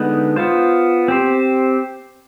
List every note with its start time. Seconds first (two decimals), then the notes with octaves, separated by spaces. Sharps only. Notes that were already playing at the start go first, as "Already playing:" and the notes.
Already playing: D3 G#3 B3 D#4 B4
0.36 B3 F4 C5
1.08 C4 G4 C5